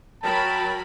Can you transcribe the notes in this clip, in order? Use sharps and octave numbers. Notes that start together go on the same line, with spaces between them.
F#3 A#4 G5 A5 B5